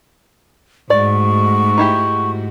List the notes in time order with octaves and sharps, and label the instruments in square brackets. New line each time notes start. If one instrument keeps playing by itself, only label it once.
[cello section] G#2 A3 F#4 [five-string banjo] D5 [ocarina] C#6
[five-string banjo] D#4 E4 G4